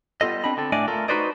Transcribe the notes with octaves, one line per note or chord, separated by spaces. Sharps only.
G3 B3 F4 A4 D#5
C4 D4 D#5 B5
D3 C4 A4
A2 A3 D4 D5 D#5 G#5
A3 F4 A4 A#4
D#4 F#4 B4 C5 D5 D#5